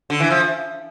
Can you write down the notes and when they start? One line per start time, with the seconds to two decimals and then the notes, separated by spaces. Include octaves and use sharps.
0.10 D3
0.20 E3
0.30 F3